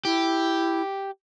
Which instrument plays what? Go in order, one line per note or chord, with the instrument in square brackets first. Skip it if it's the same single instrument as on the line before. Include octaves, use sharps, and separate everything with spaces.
[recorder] E4 [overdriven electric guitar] G4